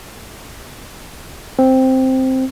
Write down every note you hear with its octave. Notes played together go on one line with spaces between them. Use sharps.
C4